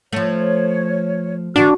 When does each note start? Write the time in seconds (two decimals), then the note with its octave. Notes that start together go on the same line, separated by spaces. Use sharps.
0.13 F3 A3 C#5
1.56 D3 E3 D4 F#4 F5